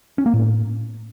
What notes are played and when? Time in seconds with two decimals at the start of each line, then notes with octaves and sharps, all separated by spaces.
0.18 C#4
0.26 A#3
0.34 A2